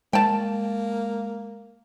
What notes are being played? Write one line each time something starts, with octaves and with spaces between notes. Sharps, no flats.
G#3 A#3 G5 A5